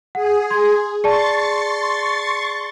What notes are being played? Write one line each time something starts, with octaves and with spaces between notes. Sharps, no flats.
G#4 F#5
C6 G#6
G#4 D5 A5 C6 C#6 A6